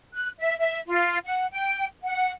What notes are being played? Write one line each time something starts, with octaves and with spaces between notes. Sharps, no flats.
F#6
E5
E5
F4
F#5
G5
F#5